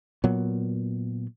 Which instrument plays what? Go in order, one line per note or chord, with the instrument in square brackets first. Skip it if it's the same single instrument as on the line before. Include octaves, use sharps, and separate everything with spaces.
[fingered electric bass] A#2 F#3 B3